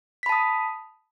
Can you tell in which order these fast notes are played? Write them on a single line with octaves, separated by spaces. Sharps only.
B6 B5 A5 D#6